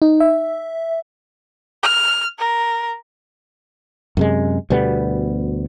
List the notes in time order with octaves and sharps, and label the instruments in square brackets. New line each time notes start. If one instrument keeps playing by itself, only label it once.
[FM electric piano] D#4
E5
[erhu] F6
A#4
[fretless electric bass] F#2 C3 G#3
D2 B2 G3 B3